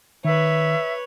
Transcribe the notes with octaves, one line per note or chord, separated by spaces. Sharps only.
D#3 B4 C#5 E5